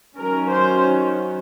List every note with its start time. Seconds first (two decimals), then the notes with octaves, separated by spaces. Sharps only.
0.17 D#3 F#3 C#4 A#4
0.49 C5